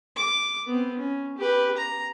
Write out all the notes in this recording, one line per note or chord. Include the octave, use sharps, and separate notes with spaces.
D6
B3 C4
C#4
G4 B4
A#5